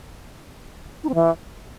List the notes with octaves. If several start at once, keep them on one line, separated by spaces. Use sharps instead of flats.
D#4
C4
E3